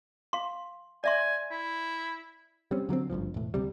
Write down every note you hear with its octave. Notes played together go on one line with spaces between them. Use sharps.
F5 C6
D5 E5 G#5 C6
E4
G3 C4 C#4
D3 F#3 G#3 C4
G#1 D2 G2 F3
E1 A2
D2 C3 G3